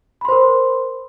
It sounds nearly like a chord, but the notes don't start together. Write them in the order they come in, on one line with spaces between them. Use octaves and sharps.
B5 C6 C5 A#4